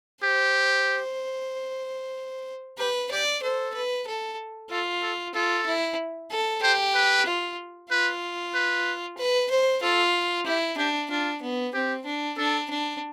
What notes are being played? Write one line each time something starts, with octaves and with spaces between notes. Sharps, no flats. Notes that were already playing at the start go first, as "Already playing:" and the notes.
G4 C5
G4 B4
G4 D5
A4 C5
B4
A4
F4 A4
A4
F4 A4
E4
A4
G4 C5
B4
F4
F4 B4
B4
B4
C5
F4 A4
E4 G4
D4 G4
D4 F4
B3
C4 G4
D4
D4 A4
D4